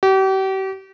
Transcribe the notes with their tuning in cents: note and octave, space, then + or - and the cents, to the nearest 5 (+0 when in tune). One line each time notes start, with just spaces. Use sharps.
G4 -40